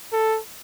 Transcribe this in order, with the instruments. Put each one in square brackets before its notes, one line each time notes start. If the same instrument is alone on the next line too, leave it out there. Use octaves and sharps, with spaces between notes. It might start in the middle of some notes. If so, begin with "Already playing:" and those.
[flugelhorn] A4